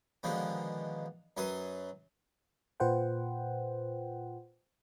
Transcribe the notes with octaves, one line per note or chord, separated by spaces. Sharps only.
B2 D3 D#3 F3 G#3 B3
F#2 F#3 B4 C6 D#6
A#2 F4 B4 C5 F#5 G5